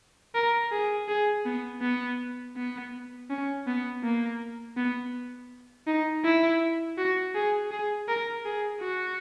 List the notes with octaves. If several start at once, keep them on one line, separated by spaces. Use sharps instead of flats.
A#4
G#4
G#4
B3
B3
B3
C#4
B3
A#3
B3
D#4
E4
F#4
G#4
G#4
A#4
G#4
F#4